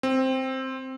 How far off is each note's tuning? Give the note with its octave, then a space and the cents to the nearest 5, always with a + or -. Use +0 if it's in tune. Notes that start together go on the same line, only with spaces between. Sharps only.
C4 +5